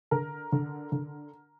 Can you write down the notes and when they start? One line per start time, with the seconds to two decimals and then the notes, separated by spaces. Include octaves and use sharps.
0.11 D3 A#4
0.52 D3
0.92 D3